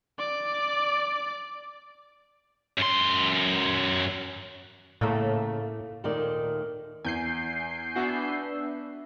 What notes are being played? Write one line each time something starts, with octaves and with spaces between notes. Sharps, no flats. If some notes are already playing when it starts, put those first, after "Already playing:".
D5 D6
F#2 C6
A2 C#3 A3 A#3
D#2 A#2 D#3 A3 D#4 D5
E2 G#5 G6 C7
B3 D4 F#4 E5